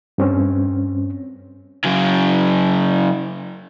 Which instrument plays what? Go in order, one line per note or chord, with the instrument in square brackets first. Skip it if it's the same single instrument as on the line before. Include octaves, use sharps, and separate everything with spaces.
[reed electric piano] G2 C4 C#4
[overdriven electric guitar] C#3 F#3